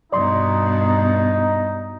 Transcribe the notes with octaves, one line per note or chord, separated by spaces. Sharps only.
G2 B2 D#4 D5 C6